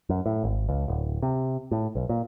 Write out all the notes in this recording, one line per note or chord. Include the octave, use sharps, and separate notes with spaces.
F#2
A2
G#1
C#2
D1
C3
A2
B1
A#2